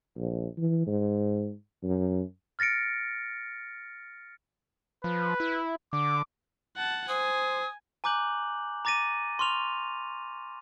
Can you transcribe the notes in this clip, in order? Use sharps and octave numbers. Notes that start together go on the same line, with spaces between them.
A#1
E3
G#2
F#2
F6 A6 A#6 C#7 D7
F3 B4
E4
D3 D6
F#5 A5
C5 G#5 D#6
G#5 A#5 D6 F#6 G6 F#7
A#5 D6 A6 A#6 D#7
C6 C#6 F6 F7